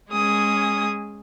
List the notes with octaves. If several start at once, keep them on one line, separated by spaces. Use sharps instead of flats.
G#3 C#4 G#4 D#6